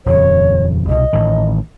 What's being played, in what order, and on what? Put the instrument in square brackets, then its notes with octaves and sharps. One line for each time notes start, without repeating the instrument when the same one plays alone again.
[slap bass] D#1 F2 C#3 [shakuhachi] C#5
[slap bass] C2 B2 [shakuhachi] D#5
[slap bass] A1 A2 D#3